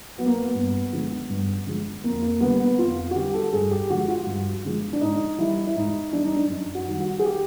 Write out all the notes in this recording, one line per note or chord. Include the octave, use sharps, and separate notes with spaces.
F#3 B3
A#3
B3
G2
D3 F3 G#3
G2
D3 F3 G#3
F2 A#3
A#3
D3 G3 B3
B3
F2 F4
F#4
D3 G3 G4
A4
G2 G#4
G4
D3 F3 G#3 F#4
F4
G2
D3 F3 G#3
D4
G#2 D#4
E3 G3 E4
E4
G#2 D#4
E3 G3 D4
D#4
D4
F#2
F#4
D#3 G3
F#4
G#4
G4